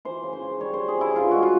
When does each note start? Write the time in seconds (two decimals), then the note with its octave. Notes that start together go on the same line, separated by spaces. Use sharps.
0.05 E3 C5
0.23 C#3
0.33 C5
0.42 C#3
0.60 G3 C#5
0.73 C5
0.79 G3
0.88 G#4
0.98 C#3 E4
1.15 G2 F4
1.31 G#3 F#4
1.43 F4